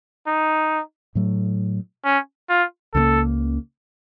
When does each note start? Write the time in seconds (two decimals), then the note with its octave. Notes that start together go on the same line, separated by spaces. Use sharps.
0.27 D#4
1.15 A2 F#3 A3
2.05 C#4
2.50 F4
2.94 C#2 C#3 F3 A#3 A4